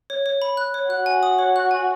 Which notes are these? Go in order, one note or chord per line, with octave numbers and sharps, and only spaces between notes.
C#5
C#5
B5
F#6
C#5
F#4 F#6
G#5
D#6
C#5
F#6
G#5